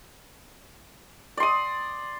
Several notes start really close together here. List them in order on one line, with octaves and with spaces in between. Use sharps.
D5 C6 D#6